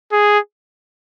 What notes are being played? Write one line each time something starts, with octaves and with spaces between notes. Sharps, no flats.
G#4